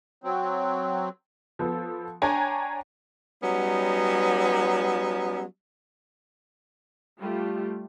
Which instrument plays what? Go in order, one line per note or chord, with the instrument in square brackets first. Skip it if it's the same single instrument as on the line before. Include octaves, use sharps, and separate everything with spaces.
[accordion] F#3 C4
[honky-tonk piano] F3 B3 A4
D4 C#5 G5 G#5 A#5
[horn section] F#3 G3 B3 C#4 D#4
[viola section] G3 A3 F4 G4